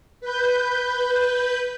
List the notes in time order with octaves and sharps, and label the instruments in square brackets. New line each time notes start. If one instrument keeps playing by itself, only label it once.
[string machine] B4 G6